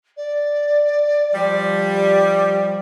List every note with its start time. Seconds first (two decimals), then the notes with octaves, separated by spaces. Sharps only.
0.17 D5
1.35 F3 G3